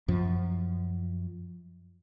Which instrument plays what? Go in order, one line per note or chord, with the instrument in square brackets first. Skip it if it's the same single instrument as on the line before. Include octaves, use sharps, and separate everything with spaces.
[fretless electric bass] F#2 F3